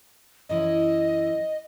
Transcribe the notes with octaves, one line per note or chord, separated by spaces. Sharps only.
F#2 E3 E4 D#5